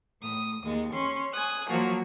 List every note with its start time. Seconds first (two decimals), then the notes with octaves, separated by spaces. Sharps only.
0.22 A2 D#6
0.62 D#2 G#3
0.92 C#4 C6
1.32 G#5 D#6 F#6
1.68 F3 F#3 A#3 F4 F#4